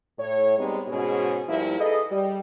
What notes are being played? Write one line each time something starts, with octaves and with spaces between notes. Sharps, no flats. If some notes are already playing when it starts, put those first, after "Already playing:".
A2 C#5
G3 G#3 B3 C4 D#4
G#2 B2 C#4 F#4 G#4
G2 F3 A#3 E4
G#4 A4 B4 D#5
G3